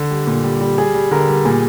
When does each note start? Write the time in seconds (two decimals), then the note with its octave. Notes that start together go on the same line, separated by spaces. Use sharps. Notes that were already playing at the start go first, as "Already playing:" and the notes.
Already playing: D3
0.10 G3
0.27 A#2
0.44 G3
0.61 G3
0.78 G3 G#4
0.94 G3
1.11 D3 A#4
1.29 G3
1.45 A#2 G#4